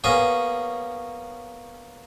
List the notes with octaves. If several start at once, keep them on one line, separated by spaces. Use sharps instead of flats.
A#3 B3 C#4 G#4